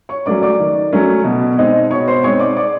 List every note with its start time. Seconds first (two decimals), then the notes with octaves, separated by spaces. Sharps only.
0.09 C#5 C#6
0.26 F#3 A3 C#4 D5 D6
0.42 D5 D6
0.60 D#3
0.92 F#3 A3 C#4
1.24 B2
1.57 G#3 C4 D#4
1.90 B2 C#5 C#6
2.08 C5 C6
2.23 G#3 C4 D#4 C#5 C#6
2.40 D5 D6
2.56 D5 D6